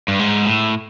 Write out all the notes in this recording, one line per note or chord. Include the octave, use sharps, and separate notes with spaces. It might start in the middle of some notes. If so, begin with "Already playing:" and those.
G2
G#2
A2